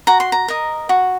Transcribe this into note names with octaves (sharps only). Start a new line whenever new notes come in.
F#4 A#5
C6
A#5
A#4 D#5
F#4